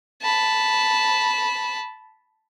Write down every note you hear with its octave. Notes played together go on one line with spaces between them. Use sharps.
A5 B5